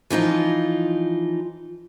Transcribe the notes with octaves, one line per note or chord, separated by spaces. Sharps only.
E3 F3 D#4 F4